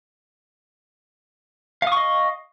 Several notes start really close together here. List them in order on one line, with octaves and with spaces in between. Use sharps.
F5 D#6 C#6 D#5